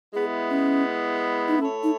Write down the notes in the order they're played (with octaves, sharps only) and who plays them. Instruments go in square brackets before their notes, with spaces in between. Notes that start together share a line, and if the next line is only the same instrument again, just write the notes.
[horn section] G#3 B3 E4 [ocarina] G#4
[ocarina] C#4
D#4
[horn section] A3 E4 A4 C#5 [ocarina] C#4
[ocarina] D#4